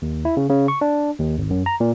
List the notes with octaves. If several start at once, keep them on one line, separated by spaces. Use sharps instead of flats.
D#2
E4
C#3
C#3
C#6
D4
D#2
G#1
F#2
A#5
A#2